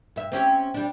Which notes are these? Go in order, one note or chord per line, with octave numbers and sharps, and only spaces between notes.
G2 E5
C4 C#4 G4
G3 D4